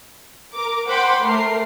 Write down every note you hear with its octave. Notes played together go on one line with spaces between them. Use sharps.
A#4 D6
C5 F#5 G5 B5 C6 D6
A3 A#4 C7